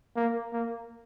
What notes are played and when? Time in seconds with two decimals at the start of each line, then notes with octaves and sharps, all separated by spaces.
0.16 A#3
0.52 A#3